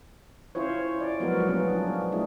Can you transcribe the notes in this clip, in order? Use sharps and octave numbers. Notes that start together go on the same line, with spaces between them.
C#4 E4 F4 C5 C#5
D5
F3 F#3 G#3 B3 F#4 A#4
G3 A#3 B3 C#4
D4 F4
G#3 A3 D4 E4 G#4